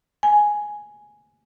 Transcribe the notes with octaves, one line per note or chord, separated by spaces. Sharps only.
G#5